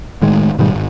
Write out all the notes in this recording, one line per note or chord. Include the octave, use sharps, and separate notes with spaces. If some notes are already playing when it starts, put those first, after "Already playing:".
A2 D#3 G#3
G#2 B2 D#3 G3
G#1